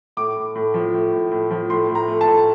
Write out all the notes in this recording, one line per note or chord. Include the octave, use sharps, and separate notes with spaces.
A2 D6
A2
A2
F3
A2
A2
A2
F3
A2 C6
A2
A#5
A3
A5
A2